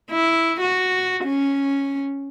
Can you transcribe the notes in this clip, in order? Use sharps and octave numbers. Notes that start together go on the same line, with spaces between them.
E4
F#4
C#4